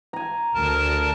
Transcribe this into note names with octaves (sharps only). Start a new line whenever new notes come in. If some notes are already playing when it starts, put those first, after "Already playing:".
G#5 A#5
D2 A#4 A5